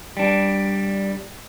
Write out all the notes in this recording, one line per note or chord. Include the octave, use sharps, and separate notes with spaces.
G3 D4